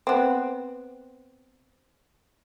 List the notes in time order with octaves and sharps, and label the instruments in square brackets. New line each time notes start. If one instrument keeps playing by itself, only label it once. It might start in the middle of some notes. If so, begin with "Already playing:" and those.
[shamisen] B3 C4